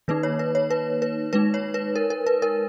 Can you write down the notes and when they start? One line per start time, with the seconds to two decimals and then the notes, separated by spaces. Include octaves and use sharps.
0.08 D#3 A#3 D#4 B4
0.23 C#5
0.39 B4
0.55 C#5
0.70 B4
1.02 B4
1.33 G#3 D#4 B4
1.54 C#5
1.74 B4
1.95 A#4
2.10 A#4
2.26 B4
2.42 A#4